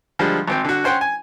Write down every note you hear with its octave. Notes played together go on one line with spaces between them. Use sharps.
D3 F3 G3 G#3
G#1 C4 G5
D3 F#4
C#4 C5 F#5 G5
G#5